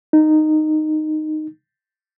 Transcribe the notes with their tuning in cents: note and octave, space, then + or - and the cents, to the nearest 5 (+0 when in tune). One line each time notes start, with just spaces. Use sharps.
D#4 -10